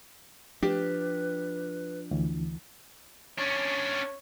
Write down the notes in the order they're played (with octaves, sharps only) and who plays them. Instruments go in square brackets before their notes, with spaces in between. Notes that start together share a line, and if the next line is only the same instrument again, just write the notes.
[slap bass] F3 D4 [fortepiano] G4 [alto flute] B4
[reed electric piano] D2 E3
[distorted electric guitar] C#4 D4 [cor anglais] C#5